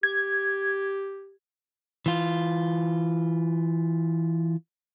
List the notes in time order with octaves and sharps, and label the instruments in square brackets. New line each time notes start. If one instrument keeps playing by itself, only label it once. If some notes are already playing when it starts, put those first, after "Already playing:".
[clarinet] G4 [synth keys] G#6
[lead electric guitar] E3 F4